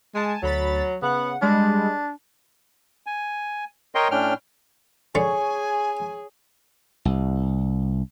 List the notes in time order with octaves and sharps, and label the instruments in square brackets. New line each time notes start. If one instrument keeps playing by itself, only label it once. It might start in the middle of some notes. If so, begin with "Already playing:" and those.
[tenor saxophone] G#3 [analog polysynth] G#5 A5
[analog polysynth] D2 B5 A6 [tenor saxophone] F#3
[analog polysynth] C#3 F#5 [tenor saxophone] B3
[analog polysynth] G3 G#3 [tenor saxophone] D4
[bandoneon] G#5
A#4 C#5 D#5 G5 C6
A2 C#4 D4 G5 F6
[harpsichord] D3 D5 C#6 [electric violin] G#4 [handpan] C#5 [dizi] G#5
[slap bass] C2